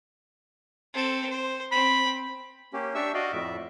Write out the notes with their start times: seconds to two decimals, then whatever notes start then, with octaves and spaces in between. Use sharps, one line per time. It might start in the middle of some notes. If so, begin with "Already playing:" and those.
0.94 C4 A4
1.30 C5
1.71 C4 B5
2.73 A#3 C#4 G4
2.95 D4 G4 E5 C#6 E6
3.14 F#4 D5 D#5 F5
3.32 F2 A2 E5